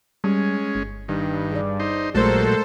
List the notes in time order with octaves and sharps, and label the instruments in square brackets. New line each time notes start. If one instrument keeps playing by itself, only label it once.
[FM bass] G3 [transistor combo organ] G#3 C#4
[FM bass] G1
[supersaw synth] G2 [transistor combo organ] D#3
[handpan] G#4 D5
[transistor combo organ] D#4 C5
[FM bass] A#1 [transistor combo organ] A#2 F#3 [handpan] G#3 A3 A#4 [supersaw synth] A4 C5